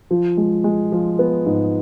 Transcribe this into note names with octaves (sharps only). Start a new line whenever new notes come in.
F3
G#3
G#3
F3
B3
G#2